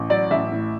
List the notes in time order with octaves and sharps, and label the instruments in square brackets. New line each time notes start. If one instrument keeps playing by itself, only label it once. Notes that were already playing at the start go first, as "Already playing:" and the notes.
Already playing: [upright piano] A1
F#3 D5
A1 E5
A2